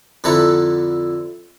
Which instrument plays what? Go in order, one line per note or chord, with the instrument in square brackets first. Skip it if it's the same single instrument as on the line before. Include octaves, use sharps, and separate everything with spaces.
[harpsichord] F2 D3 E4 A4 F#5 A#5